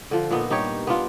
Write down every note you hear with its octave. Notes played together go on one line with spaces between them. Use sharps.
D3 F3
A#2 B3 D#4
G2 D#4 G4 C#5
B3 D4 F4